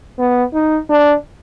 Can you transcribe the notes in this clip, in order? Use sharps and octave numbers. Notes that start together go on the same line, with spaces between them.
B3
D#4
D4